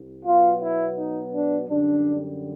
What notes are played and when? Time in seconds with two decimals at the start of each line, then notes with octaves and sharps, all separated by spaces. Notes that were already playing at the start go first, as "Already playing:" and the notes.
Already playing: C2
0.25 B2 F#3 B3 F4
0.61 E4
0.96 D#4
1.32 D4
1.68 F#2 D3 G3 D4